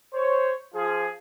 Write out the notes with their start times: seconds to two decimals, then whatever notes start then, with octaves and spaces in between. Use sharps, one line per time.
0.14 C5 C#5
0.74 F3 F4 G#4